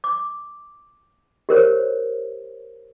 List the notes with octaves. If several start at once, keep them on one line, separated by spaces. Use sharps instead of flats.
D6
G4 A#4 C5 C#5